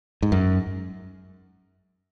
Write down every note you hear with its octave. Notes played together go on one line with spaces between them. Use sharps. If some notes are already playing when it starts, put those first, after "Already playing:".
G#2
F#2